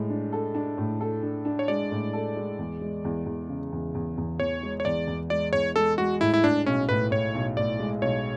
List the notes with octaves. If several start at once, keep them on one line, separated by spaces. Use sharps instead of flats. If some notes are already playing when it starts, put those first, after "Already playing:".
Already playing: A2 G#3
D4
A4
D4
A2
A4
D4
D4
C#5
G#3 D5
A2
A4
G#3
E2
G#3
E2
E2
C#3
E2
E2
E2
E2 C#5
G#3
C#5
E2 D5
E2
G#3 D5
E2 C#5
G#3 A4
G#3 F#4
A2 E4
E4
A2 D4
B1 C#4
A2 B4
A2 C#5
B1
A2 D5
G#3
B1 C#5